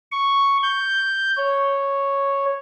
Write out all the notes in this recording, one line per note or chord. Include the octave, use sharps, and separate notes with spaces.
C#6
G6
C#5